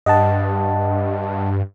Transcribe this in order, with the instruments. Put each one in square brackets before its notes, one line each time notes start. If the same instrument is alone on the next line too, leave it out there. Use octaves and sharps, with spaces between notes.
[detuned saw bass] G2 [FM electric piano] D#5 F#5 A5